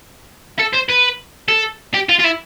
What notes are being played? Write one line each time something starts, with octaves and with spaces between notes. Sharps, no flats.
A4
C5
B4
A4
G4
F4
F4
E4